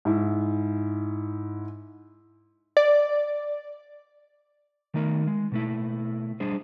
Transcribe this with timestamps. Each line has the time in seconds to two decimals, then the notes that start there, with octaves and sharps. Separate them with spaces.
0.05 G#2 E4
2.77 D5
4.94 D#3 A3 D#4 A#4
5.27 G#3
5.52 B2 A3 E4
6.40 G3 D4 G#4 C5